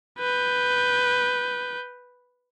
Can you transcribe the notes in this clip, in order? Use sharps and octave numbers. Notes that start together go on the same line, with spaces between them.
B4 G6